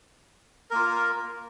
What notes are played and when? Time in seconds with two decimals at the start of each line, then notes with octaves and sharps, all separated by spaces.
0.70 A#4
0.73 A#3
0.76 F4